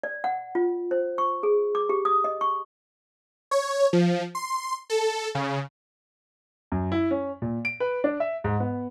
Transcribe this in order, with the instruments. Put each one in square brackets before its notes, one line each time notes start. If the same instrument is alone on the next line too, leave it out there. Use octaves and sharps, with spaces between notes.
[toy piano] D5
F#5
F4
C5
C#6
G#4
D6
G4
D#6
D#5
C#6
[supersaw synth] C#5
F3
C6
A4
C#3
[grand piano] F#2
E4
C#4
A#2
D7
B4
D4
E5
G#2
B3